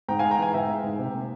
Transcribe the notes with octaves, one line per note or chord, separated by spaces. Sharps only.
G#2 G5 A#5
F5 G#5
G#3
G5 A#5
E3 F5 G#5
G#2 E5 G5
G#3
G#2
C3
A#3